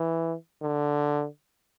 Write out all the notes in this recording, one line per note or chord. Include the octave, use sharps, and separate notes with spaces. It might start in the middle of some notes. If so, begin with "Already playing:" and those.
Already playing: E3
D3